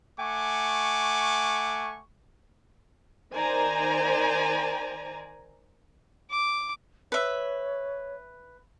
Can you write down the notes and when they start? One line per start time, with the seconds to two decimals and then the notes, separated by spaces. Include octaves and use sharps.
0.18 A3 F#5 G#5 C#6 D6
3.33 D#3 C5 D5 G#5 A#5
6.31 D6
7.12 B4 C#5 E5